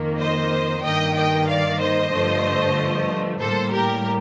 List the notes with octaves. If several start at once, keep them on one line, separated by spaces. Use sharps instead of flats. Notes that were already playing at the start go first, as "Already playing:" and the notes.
Already playing: F2 D#3 A#3
C5 D#5
G2 D#3 A#3 D#5 G5
D#5 G5
D5 F5
C5 D#5
G2 D3 F3 A3
A2 G3 A#3 A4 C5
G4 A#4